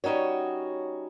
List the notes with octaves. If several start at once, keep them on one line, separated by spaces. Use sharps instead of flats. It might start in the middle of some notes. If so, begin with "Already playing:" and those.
G3 C#4 D#4 F#4 C#5